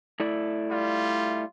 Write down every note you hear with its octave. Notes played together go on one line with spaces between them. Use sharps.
A3 E4 D5
G3 F4